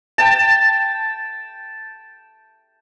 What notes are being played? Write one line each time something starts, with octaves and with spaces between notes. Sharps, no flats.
G5 A5